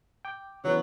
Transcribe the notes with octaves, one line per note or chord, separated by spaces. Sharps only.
G5 D6
C#3 E3 F#3 B3